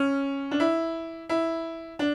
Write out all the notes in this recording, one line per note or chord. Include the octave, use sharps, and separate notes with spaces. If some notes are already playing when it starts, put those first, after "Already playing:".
Already playing: C#4
D4
E4
E4
D4